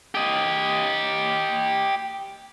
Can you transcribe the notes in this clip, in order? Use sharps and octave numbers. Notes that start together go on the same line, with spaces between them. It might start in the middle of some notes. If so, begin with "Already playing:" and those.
G4 D#5